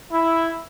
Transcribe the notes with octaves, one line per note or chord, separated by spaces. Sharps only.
E4